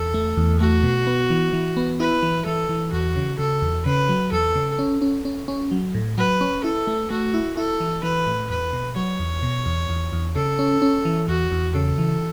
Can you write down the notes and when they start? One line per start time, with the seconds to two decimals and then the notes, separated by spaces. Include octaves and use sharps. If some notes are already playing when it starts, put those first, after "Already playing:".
Already playing: E2 A4
0.14 A3
0.37 E2
0.60 A3 F#4
0.83 B2
1.07 B3
1.30 E3
1.53 E3
1.77 B3
2.00 E4 B4
2.23 E3
2.46 E3 A4
2.69 E3
2.93 E2 F#4
3.16 C#3
3.39 C#3 A4
3.62 E2
3.86 C#3 B4
4.09 F#3
4.32 E2 A4
4.55 C#3
4.79 C#4
5.02 C#4
5.25 C#4
5.48 C#4
5.71 F#3
5.94 A2
6.18 F#3 B4
6.41 C#4
6.64 E4 A4
6.87 A3
7.10 A3 F#4
7.34 E4
7.57 E4 A4
7.80 E3
8.03 E3 B4
8.27 A2
8.50 E2 B4
8.73 B2
8.96 F#3 C#5
9.20 E2
9.43 B2
9.66 E2
9.89 E2
10.12 E2
10.35 C#3 A4
10.59 C#4
10.82 C#4
11.05 E3
11.28 E2 F#4
11.52 E2
11.75 C#3 A4
11.98 E3